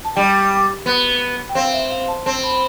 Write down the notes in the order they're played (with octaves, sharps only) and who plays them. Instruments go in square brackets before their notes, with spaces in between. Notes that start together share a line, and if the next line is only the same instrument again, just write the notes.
[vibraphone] A5
[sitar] G3 [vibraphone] G5
[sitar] B3
[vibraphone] G5
[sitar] C4 [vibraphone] F5
[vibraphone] E5
F5
A5
[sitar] C4 [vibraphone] A5
[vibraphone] B5